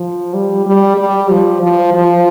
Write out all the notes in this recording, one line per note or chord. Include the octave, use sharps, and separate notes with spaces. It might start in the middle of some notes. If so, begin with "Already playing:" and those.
Already playing: F3
G3
G3
G3
F3
F3
F3